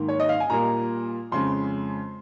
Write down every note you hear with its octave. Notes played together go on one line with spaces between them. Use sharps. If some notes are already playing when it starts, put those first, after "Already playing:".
Already playing: G#2 D#3 A#3
C#5
D#5
F5
G#5
A#2 G3 A#3 A#5
F2 C#3 G#3 C6